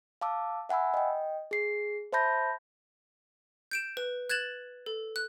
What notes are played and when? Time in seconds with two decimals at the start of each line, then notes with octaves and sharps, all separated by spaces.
0.21 F5 A5 D6 E6
0.69 E5 F#5 G#5 B5 E6
0.94 D#5 G5
1.51 G#4 C7
2.13 C5 E5 A5 B5 G6 A#6
3.71 G6 D7 E7
3.97 B4
4.30 F#6 G#6 A6 E7 F#7
4.86 A4
5.16 F#6